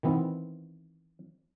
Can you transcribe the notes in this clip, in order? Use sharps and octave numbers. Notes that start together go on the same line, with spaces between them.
D#3 E3 B3 C4